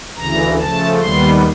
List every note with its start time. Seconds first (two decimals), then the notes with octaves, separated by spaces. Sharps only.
0.16 D2 C#3 E3 A#5
0.59 C#3 F3 A3 A5
1.00 D#2 D#3 G3 B3 C6